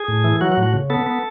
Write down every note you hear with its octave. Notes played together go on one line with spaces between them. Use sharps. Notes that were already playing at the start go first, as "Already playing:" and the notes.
Already playing: G#4
A2
E3
F#3 F#4
F#4
A2
F#4
C#3
B3 A4
B3